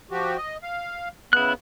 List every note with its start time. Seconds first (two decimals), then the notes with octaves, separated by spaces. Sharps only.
0.11 F3 F#4 G4
0.37 D#5
0.62 F5
1.33 C#3 B3 E4 F#6